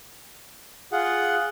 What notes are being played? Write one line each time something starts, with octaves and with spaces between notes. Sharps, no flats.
F4 G#4 F#5